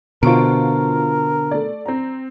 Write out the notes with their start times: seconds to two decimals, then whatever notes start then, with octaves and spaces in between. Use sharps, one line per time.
0.23 B2 D3 F4 A#4 C5 C#6 D7
1.51 A3 D5
1.86 C4 A#5